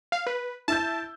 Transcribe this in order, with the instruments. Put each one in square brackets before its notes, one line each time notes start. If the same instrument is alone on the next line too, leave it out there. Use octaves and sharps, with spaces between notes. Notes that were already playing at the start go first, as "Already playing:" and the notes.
[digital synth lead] F5
B4
[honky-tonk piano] E4 E6 G6 [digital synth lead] A5